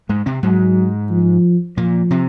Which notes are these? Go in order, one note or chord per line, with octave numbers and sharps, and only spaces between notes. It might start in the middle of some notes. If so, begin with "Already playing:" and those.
G#2 G#3
C3 C4
G#2 F#3 G#3
F3
A#2 F3 A#3
C3 C4